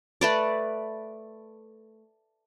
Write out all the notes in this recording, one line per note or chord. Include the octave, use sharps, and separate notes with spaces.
A3 B4 D5